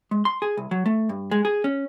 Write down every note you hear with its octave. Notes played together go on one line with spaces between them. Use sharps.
G#3
C6
G#4
C2
F#3
A3
G2
G#3
G#4
C#4